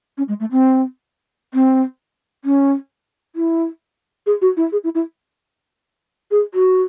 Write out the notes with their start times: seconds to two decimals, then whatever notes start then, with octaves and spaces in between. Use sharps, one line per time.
0.18 C#4
0.28 G#3
0.40 A3
0.51 C4
1.54 C4
2.45 C#4
3.36 E4
4.26 G#4
4.42 F#4
4.57 E4
4.72 G#4
4.84 E4
4.95 E4
6.31 G#4
6.54 F#4